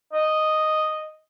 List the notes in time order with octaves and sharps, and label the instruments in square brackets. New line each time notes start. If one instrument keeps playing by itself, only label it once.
[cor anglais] D#5